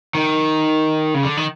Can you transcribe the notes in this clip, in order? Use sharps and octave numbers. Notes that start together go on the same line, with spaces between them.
D#3
C#3
D3
D#3